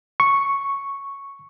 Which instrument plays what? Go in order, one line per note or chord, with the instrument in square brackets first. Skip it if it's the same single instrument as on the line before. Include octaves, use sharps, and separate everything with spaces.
[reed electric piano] C#6